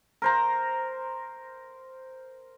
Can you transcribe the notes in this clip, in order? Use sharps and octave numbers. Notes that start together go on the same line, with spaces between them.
A#4 C5 A#5